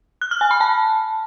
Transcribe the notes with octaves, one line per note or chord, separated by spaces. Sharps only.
F#6
F6
G#5
B5
A5